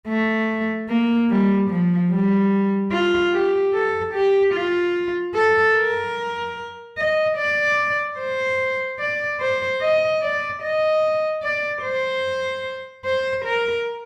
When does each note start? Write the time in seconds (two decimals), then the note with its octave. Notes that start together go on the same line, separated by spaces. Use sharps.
0.08 A3
0.89 A#3
1.30 G3
1.70 F3
2.11 G3
2.92 F4
3.33 G4
3.73 A4
4.14 G4
4.54 F4
5.35 A4
5.76 A#4
6.98 D#5
7.37 D5
8.19 C5
8.99 D5
9.40 C5
9.81 D#5
10.22 D5
10.62 D#5
11.43 D5
11.83 C5
13.05 C5
13.45 A#4